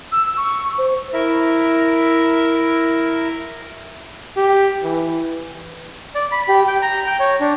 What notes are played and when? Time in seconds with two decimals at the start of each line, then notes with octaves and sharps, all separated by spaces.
0.12 E6
0.37 C#6
0.78 C5
1.13 E4 A#4 E5
4.37 G4
4.82 E3
6.15 D5
6.32 B5
6.48 G4
6.68 G5
6.82 A#5
7.07 G5
7.20 C#5
7.41 D4